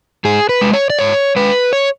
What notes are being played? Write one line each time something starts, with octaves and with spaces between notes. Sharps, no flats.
G#2 G#4
B4
G#3
C#5
D5
G#2 C#5
G#3 B4
C#5